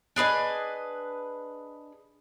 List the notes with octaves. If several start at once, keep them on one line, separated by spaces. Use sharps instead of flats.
D4 G#4 B4 D#5